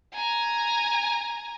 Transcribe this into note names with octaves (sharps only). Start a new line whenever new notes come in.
G#5 A#5